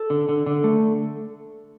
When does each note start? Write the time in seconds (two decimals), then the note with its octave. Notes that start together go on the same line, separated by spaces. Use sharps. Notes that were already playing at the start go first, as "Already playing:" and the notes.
Already playing: A4
0.10 D3
0.29 D3
0.46 D3
0.64 A3